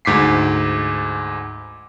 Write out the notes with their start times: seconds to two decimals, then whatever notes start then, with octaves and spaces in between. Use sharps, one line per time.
0.05 D2 G#2 D6 B6 C7